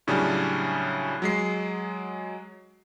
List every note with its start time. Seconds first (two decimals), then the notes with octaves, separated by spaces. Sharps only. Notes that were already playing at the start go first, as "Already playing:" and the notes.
0.07 A2 C#3 F#3 G3 C#4 D4
1.22 F#3 G#3 C7